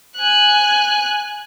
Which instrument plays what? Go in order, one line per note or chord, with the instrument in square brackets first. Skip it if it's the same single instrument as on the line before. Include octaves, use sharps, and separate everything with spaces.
[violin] G#5 F#6